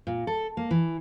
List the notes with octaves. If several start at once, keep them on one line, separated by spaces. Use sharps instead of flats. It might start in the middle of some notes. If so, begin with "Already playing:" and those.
A#2
A4
A#3
E3